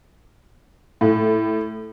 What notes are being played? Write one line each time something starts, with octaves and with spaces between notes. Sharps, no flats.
A2